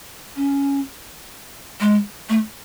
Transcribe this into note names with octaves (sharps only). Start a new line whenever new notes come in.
C#4
G#3
A3